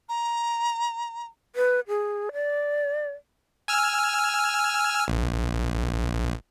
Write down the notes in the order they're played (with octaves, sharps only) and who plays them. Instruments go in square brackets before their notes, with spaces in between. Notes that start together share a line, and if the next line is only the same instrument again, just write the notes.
[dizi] A#5
[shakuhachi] B4
G#4
D5
[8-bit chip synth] G#5 E6 F6
A#1